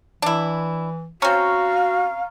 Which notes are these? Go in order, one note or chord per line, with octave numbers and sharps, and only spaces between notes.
E3 D4 E4
C4 C#4 F#4 F5 A#5 C#6 F6